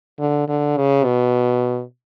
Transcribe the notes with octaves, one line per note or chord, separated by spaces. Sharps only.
D3
D3
C#3
B2